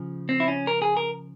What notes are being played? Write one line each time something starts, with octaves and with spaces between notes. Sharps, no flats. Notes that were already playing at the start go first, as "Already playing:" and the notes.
Already playing: C#3 F3
C4
E4
C#4
A#4
G#4
A#4